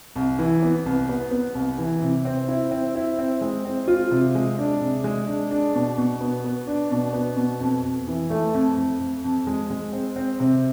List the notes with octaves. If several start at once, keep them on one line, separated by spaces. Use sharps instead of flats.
C2
E3
B3
C2
B3
B3
C2
E3
C3
C4
E4
C4
E4
C4
G#3
C4
F4
C3
G#3
D4
C3
G#3
D4
D4
B2
B2
B3
B3
D4
B2
B3
B2
F2
F2
E3
A3
F2
F2
F2
F2
G#3
G#3
C4
C4
C3